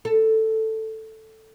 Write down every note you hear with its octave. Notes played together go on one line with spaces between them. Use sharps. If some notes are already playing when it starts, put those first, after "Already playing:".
A4